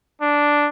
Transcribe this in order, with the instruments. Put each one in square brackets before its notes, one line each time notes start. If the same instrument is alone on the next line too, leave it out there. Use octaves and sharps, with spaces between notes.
[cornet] D4